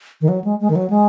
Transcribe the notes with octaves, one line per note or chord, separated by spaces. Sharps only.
D#3
F#3
G#3
G#3
D#3
F#3
G#3